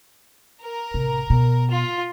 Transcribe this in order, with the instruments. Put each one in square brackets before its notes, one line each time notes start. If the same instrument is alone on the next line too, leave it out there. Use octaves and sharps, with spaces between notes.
[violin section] A#4
[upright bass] A1 C3
B2
[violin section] F4